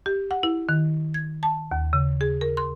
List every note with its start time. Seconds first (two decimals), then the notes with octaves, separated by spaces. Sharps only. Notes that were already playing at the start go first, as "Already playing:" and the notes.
0.06 G4
0.31 F#5
0.43 E4
0.69 D#3
1.14 G#6
1.43 A5
1.71 D#2
1.93 C#3
2.21 G#4
2.41 A#4
2.57 C6